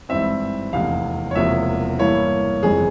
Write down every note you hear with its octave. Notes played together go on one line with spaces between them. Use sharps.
G#1 G2 E3 G3 C4 E5
F1 E2 C3 F5
C#5
E1 E2 C3 F3 A#3 E5
G2 E3 A#3 E4 C#5
G1 F2 C3 E3 G#4